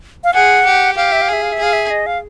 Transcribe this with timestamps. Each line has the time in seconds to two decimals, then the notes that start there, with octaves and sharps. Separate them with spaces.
0.24 F5
0.34 G#4 F#5
0.65 G4
0.97 G4 F5
1.12 E5
1.22 F5
1.28 G#4
1.33 E5
1.42 F5
1.52 E5
1.59 G#4 F5
1.73 E5
1.90 D#5
2.06 F5